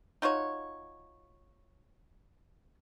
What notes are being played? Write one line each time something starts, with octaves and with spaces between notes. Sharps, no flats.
D#4 F4 F#4 C#5